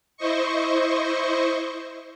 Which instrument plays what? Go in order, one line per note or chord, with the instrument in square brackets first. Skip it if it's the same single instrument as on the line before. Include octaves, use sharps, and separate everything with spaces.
[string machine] E4 C5 D#5 C#6